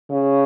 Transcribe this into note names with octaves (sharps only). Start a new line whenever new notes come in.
C#3